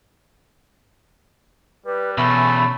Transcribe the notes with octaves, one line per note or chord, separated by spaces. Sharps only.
G3 B4
E2 B2 A3 C#4 B5